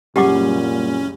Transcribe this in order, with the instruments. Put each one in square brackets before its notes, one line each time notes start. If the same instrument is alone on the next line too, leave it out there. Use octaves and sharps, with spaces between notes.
[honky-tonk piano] F#1 C2 [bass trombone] A#2 [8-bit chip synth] C#4 [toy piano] G4 F#5 D6